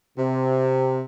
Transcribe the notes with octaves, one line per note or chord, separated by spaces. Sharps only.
C3